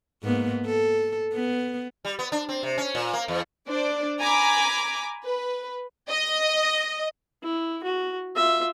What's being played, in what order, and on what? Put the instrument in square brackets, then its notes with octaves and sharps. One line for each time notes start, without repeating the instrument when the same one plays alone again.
[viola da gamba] G#2 A#3 B3
A4
B3
[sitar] G3
B3
D4
C4
C3
C#4
A#2
A#3
E2
[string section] D4 C5 D5
G#5 A#5 B5 D6
B4
[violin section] D#5
[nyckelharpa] E4
F#4
F4 E5